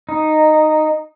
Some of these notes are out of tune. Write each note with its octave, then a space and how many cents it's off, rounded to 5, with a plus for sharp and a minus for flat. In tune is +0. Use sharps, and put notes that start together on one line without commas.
D#4 -10